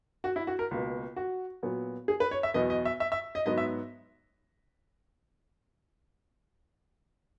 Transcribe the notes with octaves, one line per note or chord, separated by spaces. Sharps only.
F#4
E4
F#4
A#4
C#2 B2 A#3
F#4
A#2 F#3 B3
G#4
B4
C#5
E5
E2 B2 F#3 B3 D#5
D#5
E5
E5
E5
D#5
G#2 F#3 B3 D#5
E5